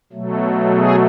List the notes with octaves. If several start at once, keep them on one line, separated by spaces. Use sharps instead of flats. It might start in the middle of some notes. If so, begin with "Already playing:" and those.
B2 F#3 A3
G#4